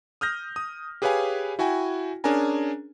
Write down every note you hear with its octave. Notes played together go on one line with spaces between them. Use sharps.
D#6 F6 G6 A#6
D#6
G4 G#4 B4 C#5 F5 G#5
E4 F#4 G5 G#5
C#4 D4 G#4 A#4 G#5 A#5